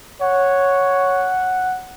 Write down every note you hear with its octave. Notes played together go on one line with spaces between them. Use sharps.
C#5 F#5